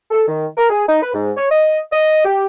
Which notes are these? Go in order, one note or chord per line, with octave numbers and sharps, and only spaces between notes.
A4
D#3
A#4
G#4
D#4
B4
G#2
C#5
D#5
D#5
G4